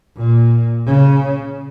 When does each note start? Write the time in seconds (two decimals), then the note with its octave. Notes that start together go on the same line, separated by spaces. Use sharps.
0.17 A#2
0.86 C#3